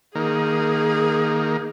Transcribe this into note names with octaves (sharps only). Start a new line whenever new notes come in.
D#3 A#3 G#4